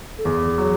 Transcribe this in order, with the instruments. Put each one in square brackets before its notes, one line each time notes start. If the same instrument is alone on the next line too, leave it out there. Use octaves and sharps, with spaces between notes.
[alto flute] A4
[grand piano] E2 [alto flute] G#4
[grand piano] F#3